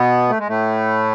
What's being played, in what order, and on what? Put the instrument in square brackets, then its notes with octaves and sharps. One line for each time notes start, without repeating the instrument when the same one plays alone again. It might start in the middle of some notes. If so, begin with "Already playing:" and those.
Already playing: [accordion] B2 B3
A3
G#3
A2 A3